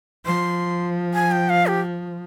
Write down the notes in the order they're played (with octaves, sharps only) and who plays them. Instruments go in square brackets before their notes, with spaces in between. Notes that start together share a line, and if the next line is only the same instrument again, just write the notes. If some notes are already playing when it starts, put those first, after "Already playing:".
[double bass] F3 [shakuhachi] C6
[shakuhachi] G#5
G5
F5
G4